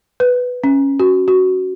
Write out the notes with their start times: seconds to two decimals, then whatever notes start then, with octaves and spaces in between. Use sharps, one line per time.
0.20 B4
0.64 C#4
1.00 F#4
1.28 F#4